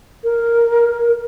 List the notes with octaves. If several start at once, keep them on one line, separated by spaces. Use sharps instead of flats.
A#4